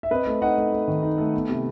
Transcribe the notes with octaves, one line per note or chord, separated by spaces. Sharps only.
E5
C4 B4 D#5
A3
D#4 D#5 F#5
A3
A3
D#3
D#4
A3
B3
C3